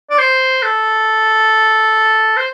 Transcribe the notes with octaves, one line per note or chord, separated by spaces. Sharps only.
D5
C5
A4
C5